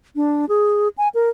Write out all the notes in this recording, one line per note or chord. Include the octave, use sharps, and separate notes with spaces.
D4
G#4
G#5
A#4